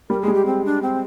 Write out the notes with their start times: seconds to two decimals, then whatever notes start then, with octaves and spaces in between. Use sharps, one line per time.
0.10 G3 A#4
0.22 G#3 G#4
0.28 G3
0.34 G4
0.46 C4
0.65 D4
0.82 C4